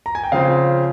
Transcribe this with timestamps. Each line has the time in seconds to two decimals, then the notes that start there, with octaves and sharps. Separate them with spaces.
0.06 A#5
0.15 G#5
0.23 G5
0.32 C#3 F3 C4 F5